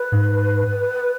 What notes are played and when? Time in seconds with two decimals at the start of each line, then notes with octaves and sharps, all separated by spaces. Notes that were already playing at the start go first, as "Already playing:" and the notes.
Already playing: B4
0.12 G#2